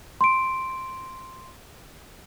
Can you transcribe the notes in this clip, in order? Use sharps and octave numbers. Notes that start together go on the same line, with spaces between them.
C6 D7